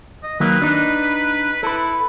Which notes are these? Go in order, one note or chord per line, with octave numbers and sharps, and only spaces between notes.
D#5
D#3 F#3 A#3 B4
D4 D#4
E4 A4 B4